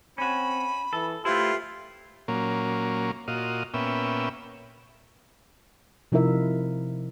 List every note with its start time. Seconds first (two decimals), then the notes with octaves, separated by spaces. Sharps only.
0.18 C4 C#4 F#4 B5
0.93 E3 A4
1.25 A3 E4 F4 G4 B4 C5 E5
2.28 A#2 F#3 A#3 C#4
3.28 A#2 F4 F#4 D#5
3.74 A#2 B3 C#4 E5 G5
6.12 C3 F3 D#4 E4 A#4 E5